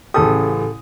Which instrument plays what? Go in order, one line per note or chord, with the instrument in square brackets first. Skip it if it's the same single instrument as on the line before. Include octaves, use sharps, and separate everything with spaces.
[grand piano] A1 C#3 D#6 [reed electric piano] G4 A4 A5